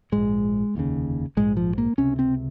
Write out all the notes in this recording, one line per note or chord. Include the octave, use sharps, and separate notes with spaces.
A#1 G#2 G#3
F1 D#2 C#3
A#1 G#2 G#3
F3
A#3
C#2 C3 C#4
C4